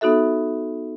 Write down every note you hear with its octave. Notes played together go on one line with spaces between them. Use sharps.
B3 D#4 F#4 A4 E5